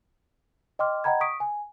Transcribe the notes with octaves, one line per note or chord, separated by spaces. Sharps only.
D#5 G5 C6 D6 F6
D#5 F#5 G5 A#5 B5 G#6
C#6 D#6 B6 D7
G#5